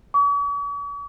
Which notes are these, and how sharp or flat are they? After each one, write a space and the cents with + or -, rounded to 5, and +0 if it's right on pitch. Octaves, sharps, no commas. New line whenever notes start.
C#6 +45